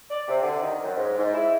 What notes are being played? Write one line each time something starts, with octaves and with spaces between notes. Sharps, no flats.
D5
C3
D3
D#3
F#2
G#2
G#2
E4